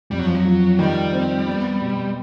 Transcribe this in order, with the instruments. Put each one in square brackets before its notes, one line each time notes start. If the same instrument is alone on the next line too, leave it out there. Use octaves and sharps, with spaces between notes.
[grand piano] F2 [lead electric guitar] G3
[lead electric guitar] F#3
F3
F#3
[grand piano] F3
[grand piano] D#3 [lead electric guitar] G3
[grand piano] C4
B3
B2